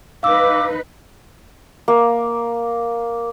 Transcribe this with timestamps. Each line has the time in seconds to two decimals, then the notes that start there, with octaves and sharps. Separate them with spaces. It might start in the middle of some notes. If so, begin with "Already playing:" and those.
0.23 D#4 B4 F5 D6 E6
1.88 A#3